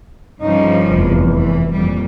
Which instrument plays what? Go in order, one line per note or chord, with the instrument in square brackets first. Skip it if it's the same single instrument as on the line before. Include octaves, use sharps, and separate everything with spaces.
[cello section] G2 C#3 F3 [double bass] D#4
[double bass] F1 E2
[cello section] E3
[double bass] F2 [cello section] A#2 G3